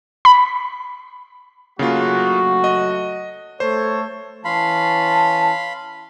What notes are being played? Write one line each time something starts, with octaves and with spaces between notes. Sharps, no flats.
B5
C#3 F#3 A3 A#3 F4 F#4
D#5
A3 A4 C5 C#5
E3 C#4 F5 A5 B5 C6